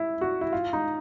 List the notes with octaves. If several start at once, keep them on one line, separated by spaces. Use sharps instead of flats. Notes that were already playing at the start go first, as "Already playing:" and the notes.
Already playing: E4
F#4
E4
F4
D#4